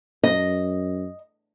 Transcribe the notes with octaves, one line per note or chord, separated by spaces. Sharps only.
F#2 D#5